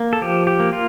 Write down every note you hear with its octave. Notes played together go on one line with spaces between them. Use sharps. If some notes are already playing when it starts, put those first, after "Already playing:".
Already playing: A#3
A4
F3 G4
G4
A#3
F4